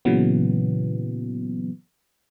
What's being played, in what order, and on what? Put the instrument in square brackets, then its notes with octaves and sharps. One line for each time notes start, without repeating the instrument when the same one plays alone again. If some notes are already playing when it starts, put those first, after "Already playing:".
[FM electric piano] A#2 C#3 E3 F#3 B3